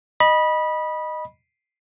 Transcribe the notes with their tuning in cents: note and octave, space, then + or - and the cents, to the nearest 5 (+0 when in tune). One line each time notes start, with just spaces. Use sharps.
D#5 -10 B5 -20